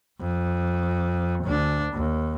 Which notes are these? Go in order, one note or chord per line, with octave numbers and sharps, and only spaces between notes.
F2
D2 D4
D#2